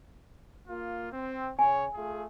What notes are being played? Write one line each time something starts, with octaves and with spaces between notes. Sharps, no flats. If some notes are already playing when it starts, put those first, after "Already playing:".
A#3 F4
C4
C#3 C#5 G#5
A3 F4 G#4